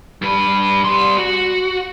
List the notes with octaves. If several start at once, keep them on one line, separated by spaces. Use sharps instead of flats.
G2 B4
G3 C6
F#4